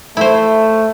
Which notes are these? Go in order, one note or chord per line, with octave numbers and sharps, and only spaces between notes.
A3 E4 C5